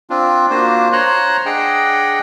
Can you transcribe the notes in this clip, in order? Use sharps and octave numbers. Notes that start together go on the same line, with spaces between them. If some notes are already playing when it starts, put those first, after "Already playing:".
C4 D4 F4
A#3 D4 F4 F#4 C5
C5 C#5 A#5 C6 F#6
D4 G#4 D#5 F#5 G5